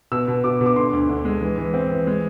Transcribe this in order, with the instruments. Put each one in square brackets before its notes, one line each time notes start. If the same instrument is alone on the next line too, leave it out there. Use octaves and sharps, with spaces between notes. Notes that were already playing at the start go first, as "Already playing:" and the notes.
[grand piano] B2 E6
B2
B2 D6
B2
D6
D3 C6
D2
D3
G#3
E3
E3
C4
E3
G#3